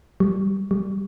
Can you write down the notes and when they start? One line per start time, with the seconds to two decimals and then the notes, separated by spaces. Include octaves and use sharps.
0.20 G3
0.71 G3